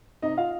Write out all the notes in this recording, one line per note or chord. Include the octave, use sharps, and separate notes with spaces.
C3 D#4 D#5
F4 F5